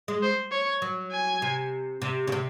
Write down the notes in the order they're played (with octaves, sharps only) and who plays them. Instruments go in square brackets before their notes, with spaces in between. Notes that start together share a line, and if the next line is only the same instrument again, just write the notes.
[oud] G#3
[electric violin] C5
C#5
[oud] F#3
[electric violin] G#5
[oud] C3
C3
C#3
C3